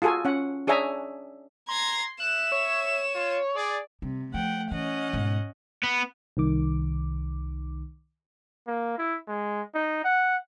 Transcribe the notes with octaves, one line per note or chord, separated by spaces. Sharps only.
F4 F#4 G#4 A4 G#5
C#4 F#5
D4 G#4 C#5 E5 G#5 A#5
A#5 C6 G#6 A#6
E5 F#6 E7
C#5
F4
G#4 D5
C3 G3
F3 A3 F#5 G5
E3 C#4 D#5 F#5
G#2 B2
B3
C2 D#3 D6
A#3
E4
G#3
D#4
F#5